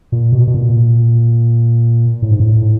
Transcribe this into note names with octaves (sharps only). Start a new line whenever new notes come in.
A#2
B2
B2
A#2
A2
G#2
A2